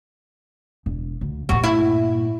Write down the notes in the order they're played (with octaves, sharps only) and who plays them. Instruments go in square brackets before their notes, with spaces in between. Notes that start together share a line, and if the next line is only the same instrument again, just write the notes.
[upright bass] E1
D2
[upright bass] G2 A#2 [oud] F#4
[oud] E4